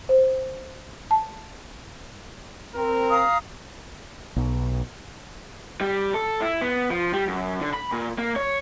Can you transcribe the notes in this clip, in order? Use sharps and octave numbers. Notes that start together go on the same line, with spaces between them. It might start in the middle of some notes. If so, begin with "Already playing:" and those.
C5
A5
C4 A#4
F5 A#5 D#6
B1
G3
A4
E4
B3
F3
G3
F#2
D3
B5
A#2
A#3
C#5